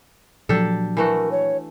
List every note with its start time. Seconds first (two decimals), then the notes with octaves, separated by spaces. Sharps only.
0.49 A#2 F3 F#3 D4 G4 A4
0.97 E3 A3 F#4 A#4
1.31 C#5